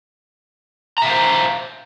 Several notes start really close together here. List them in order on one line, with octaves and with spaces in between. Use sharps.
A#5 E5 F5 C5